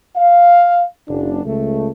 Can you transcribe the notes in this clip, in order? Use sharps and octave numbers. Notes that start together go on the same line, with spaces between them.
F5
F#1 D4
C#2 A3